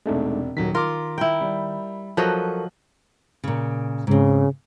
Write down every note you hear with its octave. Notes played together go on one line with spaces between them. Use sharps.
E1 C3 G#3 A3 D4 D#4
D#1 D#3 F#3 B6
F4 A#4 C6 D6
E4 G5 A#5
G3
F3 F#3 A4 A#4 D#5 C#6 F#6
A#2 C#3
G#2 C#3 C4